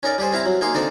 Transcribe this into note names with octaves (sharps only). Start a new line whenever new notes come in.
C#4 D#4 A#4 D5
G3 G4 G#4 C5
C4 E4 F5 A#5
F#3
A#3 D#4 G#4 F5 C6
D3 C4 D4 D#4 C5 D5